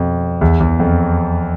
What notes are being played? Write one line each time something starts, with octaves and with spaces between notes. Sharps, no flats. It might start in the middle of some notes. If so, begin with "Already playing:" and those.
Already playing: F2 B2
E2
E2
F2